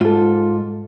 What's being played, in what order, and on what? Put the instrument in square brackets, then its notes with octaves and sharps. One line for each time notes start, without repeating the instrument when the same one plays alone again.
[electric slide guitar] G#2 [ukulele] F4 A4